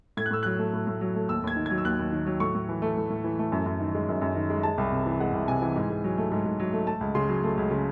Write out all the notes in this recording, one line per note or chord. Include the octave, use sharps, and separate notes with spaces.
A2 G#6
F#6
A2 E6
F#3 F#6
A3
A2
A2
F#3
A3
D#2 E6
D#2 G#6
D#3
G#6
F#3
E6
D#2 F#6
D#2
D#3
F#3
A2 C#6
A2
E3
A3
A2
A2
E3
A3
F#2
F#2
D#3
G#3
F#2
F#2
D#3
G#3
G#3 A5
C2
C3
E3
G#3 F#5
C2
C3 G#5
E3
G#2
G#2
F#3
A3
G#2
G#2
F#3
A3
A3 A5
C#2
C#3 C6
F#3
A3
C#2
C#3